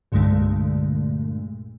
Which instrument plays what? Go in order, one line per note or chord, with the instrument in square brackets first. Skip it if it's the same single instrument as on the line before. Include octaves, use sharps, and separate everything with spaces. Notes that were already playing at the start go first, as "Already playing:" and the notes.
[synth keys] C2 G2 A#2 D3 G#3 A3